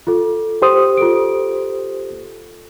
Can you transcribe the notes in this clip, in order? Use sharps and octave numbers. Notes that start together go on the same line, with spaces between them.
F4 A4
G4 C5 D#6
F4 A4 D7